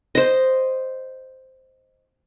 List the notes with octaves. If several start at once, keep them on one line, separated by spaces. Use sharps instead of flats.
C5 D#5